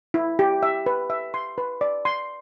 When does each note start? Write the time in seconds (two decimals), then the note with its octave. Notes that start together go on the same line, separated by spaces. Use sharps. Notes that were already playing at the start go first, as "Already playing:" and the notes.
0.14 E4
0.39 G4
0.63 E5
0.86 B4
1.10 E5
1.34 C6
1.58 B4
1.81 D5
2.05 C6